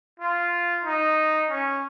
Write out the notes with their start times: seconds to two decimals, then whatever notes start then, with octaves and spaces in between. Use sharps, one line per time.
0.20 F4
0.85 D#4
1.50 C#4